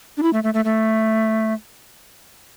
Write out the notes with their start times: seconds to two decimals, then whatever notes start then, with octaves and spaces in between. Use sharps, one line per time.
0.17 D4
0.23 E4
0.33 A3
0.44 A3
0.54 A3
0.65 A3